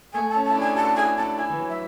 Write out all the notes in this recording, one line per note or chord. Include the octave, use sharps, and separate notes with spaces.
A3 G#5
A5
C#4
A5
E4
D4
G#5
F#4 A5
E4 G#5
D4 A5
E4 G#5
E3
F#3
E5